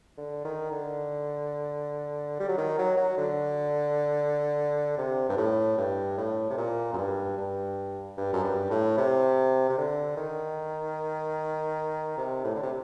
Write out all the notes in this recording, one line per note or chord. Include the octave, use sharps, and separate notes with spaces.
D3
D#3
D3
G3
F#3
D#3
F#3
F#3
D3
C3
G2
A2
G2
A2
C3
A#2
F#2
G2
G2
G2
F#2
G2
A2
C3
C3
D3
D#3
C3
A2
D3
C3